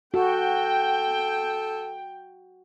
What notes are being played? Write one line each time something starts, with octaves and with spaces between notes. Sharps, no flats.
F#4 A4 G5